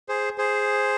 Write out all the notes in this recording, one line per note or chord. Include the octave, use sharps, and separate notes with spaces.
G#4 C5
G#4 C5